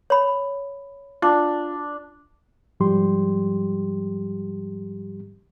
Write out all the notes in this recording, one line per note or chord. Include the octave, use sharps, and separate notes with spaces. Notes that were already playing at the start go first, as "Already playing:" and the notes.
C#5 B5
D4 F4
G#2 F3 G3 G4 C6